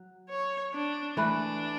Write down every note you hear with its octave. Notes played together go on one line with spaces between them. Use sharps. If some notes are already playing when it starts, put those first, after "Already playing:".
Already playing: F#3
C#5
D4
E3 A3 D4 E4 B4